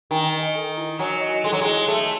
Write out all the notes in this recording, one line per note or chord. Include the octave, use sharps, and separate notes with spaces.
D#3 G#5
D#5
A4
E4
F#3 G#5
D#5
G#3 A4
F#3
G#3 E4
A3 A4